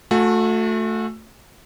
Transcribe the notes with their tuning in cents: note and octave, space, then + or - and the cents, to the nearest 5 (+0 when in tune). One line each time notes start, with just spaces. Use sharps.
A3 +5 F#4 -35 G#5 +0